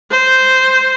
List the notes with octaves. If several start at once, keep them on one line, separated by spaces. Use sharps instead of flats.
C5